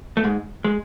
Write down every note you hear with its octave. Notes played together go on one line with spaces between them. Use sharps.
A3
G#2 G#3
G#3